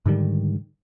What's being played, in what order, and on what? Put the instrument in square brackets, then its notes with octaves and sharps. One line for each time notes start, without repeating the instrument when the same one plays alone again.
[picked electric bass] G#2 D3 D#3 G3